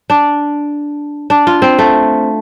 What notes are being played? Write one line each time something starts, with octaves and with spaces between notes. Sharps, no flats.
D4
D4
F4
C4
A3